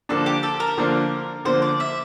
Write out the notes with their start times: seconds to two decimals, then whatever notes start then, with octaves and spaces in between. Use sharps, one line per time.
0.09 D3 F3 A#3 D4 A4
0.26 G4
0.43 A4
0.60 A#4
0.78 D3 F3 A#3 D4
1.45 D3 F3 A#3 D4 C5
1.62 D5
1.80 E5